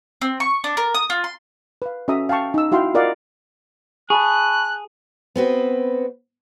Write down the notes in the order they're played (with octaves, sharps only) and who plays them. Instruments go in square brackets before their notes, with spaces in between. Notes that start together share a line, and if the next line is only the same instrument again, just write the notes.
[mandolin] C4
C#6
D4
A#4
D#6
F4
C6
[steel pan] B4 F5
C#4 F#4 A4 E5 A#5 D#6
F5 G5 A5 C#6
D#4 E6
E4 F#4 F5 G5 C6
F4 A#4 D5 D#5 F5 F#5
[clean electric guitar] G#4 [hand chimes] A5 B5 C#6 [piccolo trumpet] F#6
[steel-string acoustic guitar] B3 C4 F#4 B4